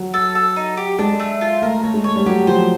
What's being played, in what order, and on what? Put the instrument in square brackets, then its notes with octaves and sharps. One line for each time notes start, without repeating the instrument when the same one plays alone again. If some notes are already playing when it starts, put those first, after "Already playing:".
Already playing: [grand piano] F#3
[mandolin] A4
A4
D#4
G4
[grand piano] G#3 [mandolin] D4
[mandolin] A3
F4
[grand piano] A3 [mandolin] A#4
[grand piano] A3 [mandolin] C#5
[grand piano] G#3
[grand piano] A3 [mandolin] C#5
[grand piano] G3
[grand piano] F#3 [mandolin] G4
[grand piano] F3 [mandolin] C5